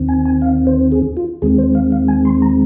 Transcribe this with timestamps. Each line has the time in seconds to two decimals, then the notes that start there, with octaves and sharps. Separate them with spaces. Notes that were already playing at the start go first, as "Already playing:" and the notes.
Already playing: D#2 D#3 C4
0.09 G#5
0.25 G#5
0.42 F5
0.67 C5
0.92 G#4
1.17 F4
1.42 D#2 D#3 G#3 C4 G#4
1.58 C5
1.75 F5
1.92 F5
2.08 G#5
2.25 C6
2.42 A#5